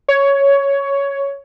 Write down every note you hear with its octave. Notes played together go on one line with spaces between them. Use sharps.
C#5